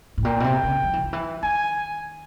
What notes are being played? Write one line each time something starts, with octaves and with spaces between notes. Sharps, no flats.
A2
A#2 G5
B2
C3
C#3
F3
E3
D#3
E3
D#3 G#5